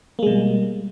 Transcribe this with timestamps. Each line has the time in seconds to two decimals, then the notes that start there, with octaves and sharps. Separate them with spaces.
0.19 A#3
0.23 G#3
0.27 B2
0.30 G3